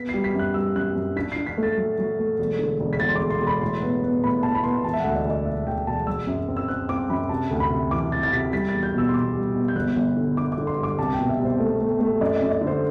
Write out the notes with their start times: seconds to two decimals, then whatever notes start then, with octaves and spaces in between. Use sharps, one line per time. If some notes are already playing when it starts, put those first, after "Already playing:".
Already playing: B3 B6
0.09 G3 C7
0.24 B6
0.34 F#2
0.39 F#6
0.54 G3 E6
0.76 F#2 F#6
0.96 F#2
1.16 D4 B6
1.32 D4 C7
1.46 B6
1.58 A3
1.63 A6
1.78 F#3
1.98 F#3
2.19 A3
2.39 E1
2.59 D3
2.80 E1
2.93 B6
3.00 E1 A6
3.09 C6
3.15 D6
3.21 E1
3.30 C6
3.41 E1
3.47 B5
3.61 A2 C6
3.82 B3
4.03 B3
4.23 A2 B5
4.43 B3 A5
4.55 B5
4.64 B3 C6
4.84 E1 A5
4.93 E5
5.00 D2 F#5
5.15 D5
5.25 D2
5.30 D5
5.45 E1 E5
5.66 D2 G5
5.87 E1 A5
6.07 F#3 E6
6.27 F#2
6.48 C4
6.57 E6
6.68 C4 F#6
6.89 C4 D6
7.10 F#2 B5
7.29 C3 A5
7.51 D2
7.60 B5
7.70 C3
7.91 E3 D6
8.11 C3 A6
8.23 A6
8.32 C3 B6
8.52 G3 B6
8.69 A6
8.74 E2
8.83 G6
8.94 B2 E6
9.09 C6
9.14 B2 D6
9.35 G3
9.56 B2
9.68 G6
9.75 G1 F#6
9.96 G1
10.16 D3
10.37 D3 D6
10.52 D6
10.58 D3
10.67 C6
10.78 G2
10.83 D6
10.98 C2 A5
11.13 G5
11.18 B2
11.29 E5
11.39 C2
11.45 C5
11.60 A3
11.81 A3
12.00 A3
12.21 F#2 D5
12.36 D5
12.42 F#2
12.51 D5
12.61 D3
12.67 C5